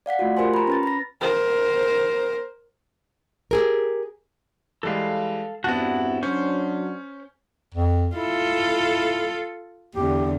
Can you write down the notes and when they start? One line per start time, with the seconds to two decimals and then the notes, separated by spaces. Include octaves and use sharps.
0.06 D5 F5 F#5 B6
0.19 A3 F4 F#4
0.37 F4 G4 A#4 C5 G#5 C6
0.54 A#5 B5
0.67 C#4 B4 A6
0.83 B5 A#6
1.21 A#4 C5
3.51 G4 G#4 A#4
4.83 E3 G3 G#3 A4 F5
5.64 E2 G2 B3 C4 E4 F#4 A5
6.23 F#3 C#4 D4 C5 C#6
7.74 F2
8.15 E4 F4 A4
9.95 E2 D3 G4